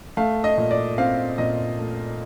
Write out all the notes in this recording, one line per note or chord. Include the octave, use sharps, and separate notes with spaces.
A3 F5
D#5
A#2
D5
C4 F5
A#2 D#5
A3